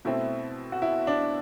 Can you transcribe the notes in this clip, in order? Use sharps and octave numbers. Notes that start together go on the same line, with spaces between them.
B2 A3 C4 E4
F#4
E4
D4